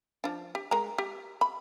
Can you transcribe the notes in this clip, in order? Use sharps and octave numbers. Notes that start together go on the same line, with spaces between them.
F3 D4
G4
G#3 A#4 A#5
G4
B5